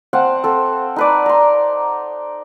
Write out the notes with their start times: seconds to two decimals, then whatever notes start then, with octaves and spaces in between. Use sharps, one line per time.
0.13 C4 F5 F#5 A5
0.44 C4 A4
0.96 D#4 B4 D5
1.26 A#5 C6